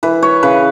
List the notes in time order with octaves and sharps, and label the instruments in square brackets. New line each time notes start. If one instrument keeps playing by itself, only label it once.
[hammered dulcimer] E3 B4
C#5
C#3 B4